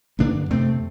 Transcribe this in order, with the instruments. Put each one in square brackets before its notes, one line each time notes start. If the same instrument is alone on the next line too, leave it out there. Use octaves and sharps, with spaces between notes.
[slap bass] G2 D3 A#3 D4
F2 C3 A3 C4